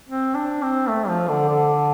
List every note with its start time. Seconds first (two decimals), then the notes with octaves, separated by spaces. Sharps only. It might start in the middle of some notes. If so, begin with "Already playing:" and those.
0.09 C4
0.35 D4
0.63 C4
0.89 A3
1.09 F3
1.29 D3
1.49 D3